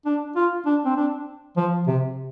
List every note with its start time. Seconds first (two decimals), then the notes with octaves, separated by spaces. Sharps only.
0.05 D4
0.36 F4
0.66 D4
0.85 C4
0.97 D4
1.57 F3
1.87 C3